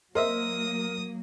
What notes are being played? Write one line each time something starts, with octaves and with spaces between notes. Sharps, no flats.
F#3 A#3 A#4 C5 D#5 E5 D#6